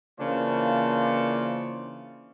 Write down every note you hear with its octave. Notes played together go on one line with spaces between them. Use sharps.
C#3 E3 A#3 D4 F4 C5